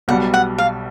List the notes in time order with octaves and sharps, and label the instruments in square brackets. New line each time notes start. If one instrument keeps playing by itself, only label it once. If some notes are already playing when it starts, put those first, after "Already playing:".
[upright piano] B1 B2 G3 [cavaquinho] F#5
[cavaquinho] F#5
F5